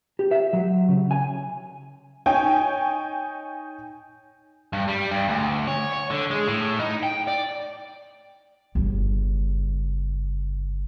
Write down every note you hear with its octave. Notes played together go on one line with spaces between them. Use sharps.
G4
E5
F#3
C#3
G#5
D#4 C#5 G5 G#5
G2
G3
G2
D2
C#5
C#5
D3
G#3
A2
D#4
G5
D5
G1 C#3